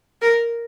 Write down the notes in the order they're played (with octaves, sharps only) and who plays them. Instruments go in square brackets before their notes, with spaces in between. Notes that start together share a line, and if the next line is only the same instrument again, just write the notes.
[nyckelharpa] A#4